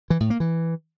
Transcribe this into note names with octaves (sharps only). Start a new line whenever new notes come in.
E3
A2
A#3
E3